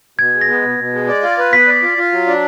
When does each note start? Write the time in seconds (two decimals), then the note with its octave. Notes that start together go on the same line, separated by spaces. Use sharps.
0.19 B2 G#6
0.34 G#3
0.41 A#6
0.49 B3
0.63 B2
0.79 B2
0.93 G#3
1.08 D5
1.23 F4
1.38 B4
1.53 B3 B6
1.67 D5
1.83 F4
1.98 F4
2.12 F#3
2.27 D4